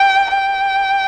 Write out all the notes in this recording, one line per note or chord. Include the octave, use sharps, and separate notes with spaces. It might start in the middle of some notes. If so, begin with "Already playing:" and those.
Already playing: G5
G5